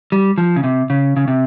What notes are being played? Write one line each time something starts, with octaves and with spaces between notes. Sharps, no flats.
G3
F3
C#3
C3
C#3
C#3
C3